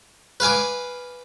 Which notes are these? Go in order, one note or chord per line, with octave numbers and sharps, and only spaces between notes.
B4 F5 G#5 D6